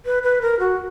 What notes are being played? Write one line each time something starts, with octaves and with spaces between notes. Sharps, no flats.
B4
B4
A#4
F#4